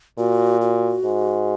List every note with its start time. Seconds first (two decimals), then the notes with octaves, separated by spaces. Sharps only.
0.18 A#2 F#4
0.61 F#4
1.05 G#2